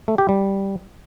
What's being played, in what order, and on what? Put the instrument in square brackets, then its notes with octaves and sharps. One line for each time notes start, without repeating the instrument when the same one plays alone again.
[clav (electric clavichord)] A3
G4
G3